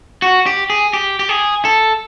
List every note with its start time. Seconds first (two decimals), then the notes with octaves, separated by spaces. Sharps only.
0.22 F#4
0.46 G4
0.70 G#4
0.93 G4
1.19 G4
1.29 G#4
1.65 A4